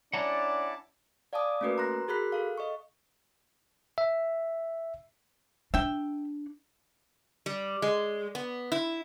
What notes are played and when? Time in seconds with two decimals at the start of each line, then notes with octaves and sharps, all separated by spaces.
0.13 C#4 D4 E4 F#5 A5 A#5 D6
1.33 D5 F5 G#5 A5 D6 D#6
1.61 A3 A#3 C#4 F#4 A#4 B4
1.78 A#5 C6 F#6 A#6
2.08 F#4 G#4 A#4 B5 F#6 B6
2.32 A4 F5
2.58 D#5 C#6
3.98 E5
5.74 D4 E5 G5
7.46 G3
7.82 G#3
8.35 B3
8.72 E4